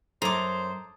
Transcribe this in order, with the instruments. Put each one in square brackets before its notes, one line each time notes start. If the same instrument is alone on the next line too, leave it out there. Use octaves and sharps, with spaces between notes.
[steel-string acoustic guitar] F#2 [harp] A4 D#6 G#6 [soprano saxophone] C5 [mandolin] A#5 D6